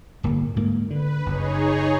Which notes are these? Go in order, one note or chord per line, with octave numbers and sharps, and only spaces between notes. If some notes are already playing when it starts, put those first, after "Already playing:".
D1 G1 A#3
D2 G#2 A#3
D3 B4
F#1 D#4 G#4 C#5